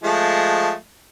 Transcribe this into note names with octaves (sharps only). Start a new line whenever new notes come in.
F3 G#3 A3